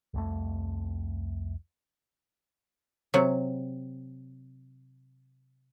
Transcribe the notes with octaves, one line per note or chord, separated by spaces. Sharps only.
C2 F2 A3
C3 F#3